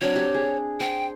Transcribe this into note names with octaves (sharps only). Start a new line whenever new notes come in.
F#3 C4 D4 C#5
G4
G#4
C5 G5